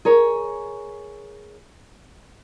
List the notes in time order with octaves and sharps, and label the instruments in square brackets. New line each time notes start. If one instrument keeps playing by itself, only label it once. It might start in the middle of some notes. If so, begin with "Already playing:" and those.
[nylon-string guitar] G#4 A#4 C#5